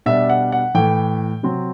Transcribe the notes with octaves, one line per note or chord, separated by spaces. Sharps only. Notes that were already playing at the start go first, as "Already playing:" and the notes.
B2 G3 D4 E5
F#5
F#5
A2 E3 A3 G5
C3 F#3 C4